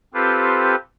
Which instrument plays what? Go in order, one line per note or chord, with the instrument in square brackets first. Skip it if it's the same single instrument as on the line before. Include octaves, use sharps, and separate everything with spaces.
[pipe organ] C4 F4 G4 A4 B4 C5